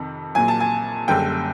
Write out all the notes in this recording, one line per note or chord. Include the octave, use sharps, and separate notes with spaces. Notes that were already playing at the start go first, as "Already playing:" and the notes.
Already playing: F2 C3 D#3
A#1 A#2 F#3 G#5
A5
G#5
F#1 F#2 D3 G3 G5